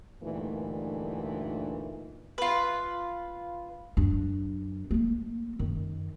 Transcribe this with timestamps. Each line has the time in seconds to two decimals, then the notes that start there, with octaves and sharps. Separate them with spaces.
0.23 D2 G2 A#2 E3 A3 D#4
2.38 F4 B4
3.97 F#2 D4
4.91 A3 A#3
5.59 F#2 D#3